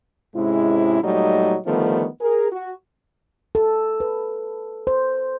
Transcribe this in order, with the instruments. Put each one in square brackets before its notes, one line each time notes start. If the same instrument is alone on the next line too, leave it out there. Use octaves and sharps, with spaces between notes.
[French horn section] G#2 C3 G#3 C#4 E4
A#2 F#3 G3 A3 D#4 D#5
D3 D#3 F3 G3 A3 B3
G#4 A#4
F#4
[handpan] A4
B4
C5